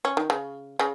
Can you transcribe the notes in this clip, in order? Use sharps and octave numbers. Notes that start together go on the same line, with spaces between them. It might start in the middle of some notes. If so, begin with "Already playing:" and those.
C#4
D#3
C#3
C#3